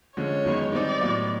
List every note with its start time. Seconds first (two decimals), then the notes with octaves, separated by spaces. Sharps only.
0.17 D3 F3 G#3 C#4 C#5
0.45 F#2 D#3 G#3 B3
0.72 D#3 G3 C4 D#4 D5
1.01 A2 F#3 B3 D#4